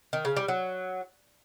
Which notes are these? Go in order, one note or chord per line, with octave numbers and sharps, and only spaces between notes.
D#3
C#3
G3
F#3